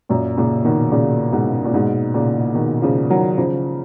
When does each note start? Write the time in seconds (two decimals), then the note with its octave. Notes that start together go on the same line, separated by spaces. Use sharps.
0.09 F#2 A#2
0.37 A#2 C#3
0.65 B2 D#3
0.92 A#2 C#3
1.32 G#2 B2
1.65 A#2
1.74 G#2 B2
2.14 A#2 C#3
2.55 B2 D#3
2.82 C#3 F3
3.10 D#3 F#3
3.38 C#3 F3